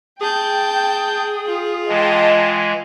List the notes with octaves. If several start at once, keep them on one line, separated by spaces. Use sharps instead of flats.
G#4 G5 A5 G6
F4
E3 G#3 D#5 G5 A5